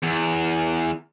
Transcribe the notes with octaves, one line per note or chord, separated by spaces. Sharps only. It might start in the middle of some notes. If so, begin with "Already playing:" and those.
E2